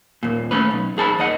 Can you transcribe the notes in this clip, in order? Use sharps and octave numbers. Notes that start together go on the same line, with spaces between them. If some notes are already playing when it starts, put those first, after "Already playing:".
D#2 A#2
A3 C#4 B4
B1
D#2 G#4 A5 B5
D#2 D#5 F#5